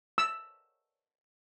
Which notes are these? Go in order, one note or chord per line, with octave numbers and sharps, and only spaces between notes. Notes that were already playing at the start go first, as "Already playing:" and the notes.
E6